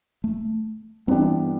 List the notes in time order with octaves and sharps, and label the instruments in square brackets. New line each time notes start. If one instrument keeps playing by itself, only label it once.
[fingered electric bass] A3
[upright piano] G2 E3 B3 D4 G4 [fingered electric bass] C4